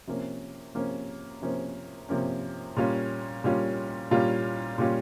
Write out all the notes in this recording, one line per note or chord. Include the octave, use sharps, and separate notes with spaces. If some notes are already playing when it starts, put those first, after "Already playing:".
C3 F3 A#3 C#4
C3 F3 A#3 C#4
C3 F3 A#3 C#4
C3 F3 A#3 C#4
A#2 G3 C#4 F4
A#2 G3 C#4 F4
A#2 G3 C#4 F4
A#2 G3 C#4 F4